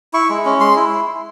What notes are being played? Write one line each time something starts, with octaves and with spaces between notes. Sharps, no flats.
E4 C#6
G#3
C#4
G#3 C6
E4